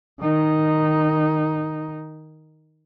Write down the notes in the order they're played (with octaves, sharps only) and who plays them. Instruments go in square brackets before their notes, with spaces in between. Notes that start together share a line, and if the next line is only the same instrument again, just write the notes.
[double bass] D#3 D#4